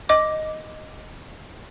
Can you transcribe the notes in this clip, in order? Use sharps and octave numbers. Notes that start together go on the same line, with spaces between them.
D#5 D6